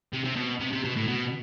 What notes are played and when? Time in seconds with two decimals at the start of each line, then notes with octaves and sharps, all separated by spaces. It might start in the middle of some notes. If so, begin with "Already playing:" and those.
0.13 C3
0.25 C3
0.36 B2
0.60 C3
0.72 C3
0.84 B2
0.96 A2
1.07 B2